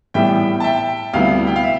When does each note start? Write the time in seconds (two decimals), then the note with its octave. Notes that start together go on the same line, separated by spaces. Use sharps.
0.14 A2 E3 G3 B3 E5 G5
0.60 A5
0.64 E5 G5
1.13 D2 C3 G3 B3 E4 F5
1.47 G5
1.56 F5
1.63 E5